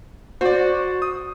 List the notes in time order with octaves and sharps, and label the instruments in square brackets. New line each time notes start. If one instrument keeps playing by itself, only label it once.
[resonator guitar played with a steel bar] F#4 [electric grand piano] C5 D5
[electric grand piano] D#6